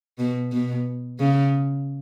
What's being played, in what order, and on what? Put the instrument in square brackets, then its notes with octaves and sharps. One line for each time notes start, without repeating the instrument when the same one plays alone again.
[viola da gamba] B2
B2
C#3